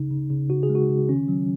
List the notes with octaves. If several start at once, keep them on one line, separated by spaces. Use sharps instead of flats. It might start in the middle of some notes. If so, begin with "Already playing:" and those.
Already playing: C#3 D#4
C#3
C#3
C#3 F#4
G#4
G#3
F#4
C#3
D#3 C#4
F#3